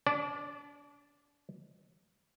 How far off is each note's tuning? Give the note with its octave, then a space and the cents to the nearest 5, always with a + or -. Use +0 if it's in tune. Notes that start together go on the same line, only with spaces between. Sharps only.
D4 -35 D5 +0